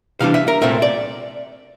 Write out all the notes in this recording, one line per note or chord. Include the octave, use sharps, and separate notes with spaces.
C3 E3 G3 D4 F5
E5
A#4
C2 A#2 A3 C4 E5
D5